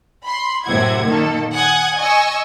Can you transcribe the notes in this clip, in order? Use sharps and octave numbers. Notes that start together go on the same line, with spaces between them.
B5 C6
F#2 A2 C3 E4 F#5 G#6
A#2 D#3 A#3 A4
F#5 G#5 D#6 F#6 G#6
D#5 G#5 C#6 E6